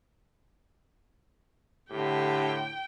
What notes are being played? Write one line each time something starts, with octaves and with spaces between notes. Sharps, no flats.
A2 D3 G4 G5